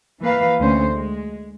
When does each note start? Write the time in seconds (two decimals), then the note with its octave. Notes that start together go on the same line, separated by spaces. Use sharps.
0.22 E3 A#3 B4 F5
0.60 D2 C#4 C5
0.93 G#3